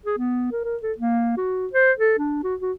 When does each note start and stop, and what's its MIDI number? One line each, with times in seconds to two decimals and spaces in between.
0.06 0.18 68
0.18 0.48 59
0.52 0.62 70
0.64 0.77 70
0.83 0.93 69
0.98 1.33 58
1.38 1.67 66
1.73 1.92 72
1.99 2.16 69
2.19 2.40 62
2.44 2.55 66
2.62 2.73 66